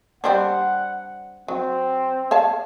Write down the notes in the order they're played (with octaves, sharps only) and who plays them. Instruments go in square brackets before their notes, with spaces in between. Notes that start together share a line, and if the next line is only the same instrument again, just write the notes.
[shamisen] G3 C4 D4 [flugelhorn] F#5
[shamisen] F#3 [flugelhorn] C4
[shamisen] C#5 F5 A5